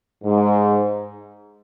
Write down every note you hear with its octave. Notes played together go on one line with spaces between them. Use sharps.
G#2